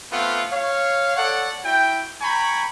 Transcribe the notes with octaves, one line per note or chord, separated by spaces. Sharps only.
A3 B3 C4 F4 F#5
C#5 F5
A4 C#5 D5 F#5
E4 F#4 G5
G5 G#5 A#5 B5 C#6